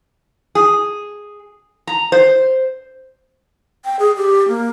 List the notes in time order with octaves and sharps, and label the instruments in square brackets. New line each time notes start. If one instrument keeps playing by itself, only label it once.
[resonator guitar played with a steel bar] G#4
A#5
C5
[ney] G5
G#4
G4
A#3